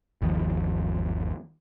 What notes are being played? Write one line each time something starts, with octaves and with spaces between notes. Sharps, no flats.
G1 D#2 D#3 F3